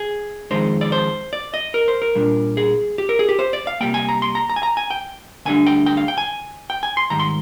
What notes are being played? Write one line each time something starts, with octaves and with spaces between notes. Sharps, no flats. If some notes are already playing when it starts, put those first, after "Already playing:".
Already playing: G#4
F2 D#3 G#3 D#4 C5
D5
C5
D5
D#5
A#4
C5
A#4
A#2 G3 D4
G#4
G4
A#4
G#4
G4
C5
D5
F5
C3 G3 A#3 G5
G#5
A#5
C6
A#5
A#5
G#5
A#5
G#5
G5
D2 D3 G3 D4 G#5
G5
G5
F5
G5
G#5
G5
G#5
C6
G#2 D#3 G3 A#5
C6